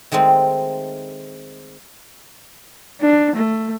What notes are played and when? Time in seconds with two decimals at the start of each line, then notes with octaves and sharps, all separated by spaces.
0.12 D#3 G#3 A3 C4
3.01 D4
3.35 A3